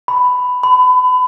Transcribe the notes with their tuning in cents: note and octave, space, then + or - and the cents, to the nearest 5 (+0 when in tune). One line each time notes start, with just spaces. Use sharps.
B5 +10
B5 +30